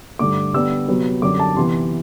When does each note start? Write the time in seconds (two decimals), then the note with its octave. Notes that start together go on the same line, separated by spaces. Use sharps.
0.19 G2 D3 A3 D6
0.54 D3 G3 B3 D4 E6
0.88 C3 F#3 B3
1.22 F#2 D3 G3 C4 D6
1.40 A5
1.56 C3 E3 B3 C6